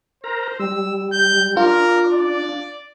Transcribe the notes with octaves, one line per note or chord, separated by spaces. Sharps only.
A#4 C5 A#5
G3 E6
G6
D4 F4 A#4
D5